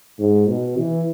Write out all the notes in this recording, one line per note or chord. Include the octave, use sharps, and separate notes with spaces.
G#2
B2
E3